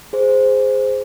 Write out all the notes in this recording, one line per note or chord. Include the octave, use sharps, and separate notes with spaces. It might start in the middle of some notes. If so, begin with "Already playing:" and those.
G#4 C5